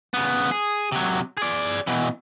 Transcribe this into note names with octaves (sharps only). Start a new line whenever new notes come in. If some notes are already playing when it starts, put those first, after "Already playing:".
C#3 B3
G#4
C3 F#3
G#4 D5
B2 E3